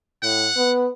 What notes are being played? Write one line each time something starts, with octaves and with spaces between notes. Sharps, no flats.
A2 F#5
B3